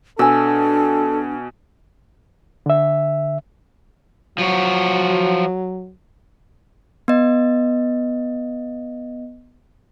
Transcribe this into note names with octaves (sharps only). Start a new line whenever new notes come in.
B2 D4 A4 G#5 E6
D3 E5
F3 F#3 F#4
B3 D#5